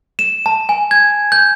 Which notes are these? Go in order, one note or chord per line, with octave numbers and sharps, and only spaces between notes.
E7
A5
G#5
G#6
G6